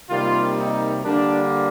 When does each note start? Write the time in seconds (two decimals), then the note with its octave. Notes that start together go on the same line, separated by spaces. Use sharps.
0.09 C3 D#3 G3 A#3 F4
0.56 D#4
1.05 D3 G3 A#3 D4